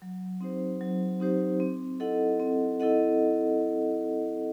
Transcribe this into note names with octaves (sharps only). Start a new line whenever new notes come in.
F#3
C4 D#4 G4 C5
F#3
C4 D#4 G4 C5
C4
E4 A4 D#5 F#5
C4
E4 A4 D#5 F#5